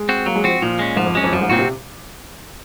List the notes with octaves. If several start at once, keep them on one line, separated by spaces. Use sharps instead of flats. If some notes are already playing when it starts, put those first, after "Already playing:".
Already playing: G#3
C4 F#4
F#3 A#3
G#3
F3 C4 F#4
A#2 F3
G#3 C#4
G#2 F3
F2
F#2 G#3 C#4
F2
F#2 F3
G#2
A#2 C4 F#4
C3